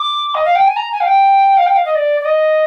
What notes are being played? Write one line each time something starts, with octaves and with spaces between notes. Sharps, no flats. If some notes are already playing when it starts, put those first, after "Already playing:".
Already playing: D6
D#5
F5
G5
G#5
A#5
G#5
F5
G5
F5
G5
F5
D#5
D5
D5
D#5